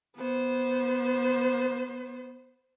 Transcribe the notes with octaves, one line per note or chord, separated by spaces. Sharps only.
B3 C5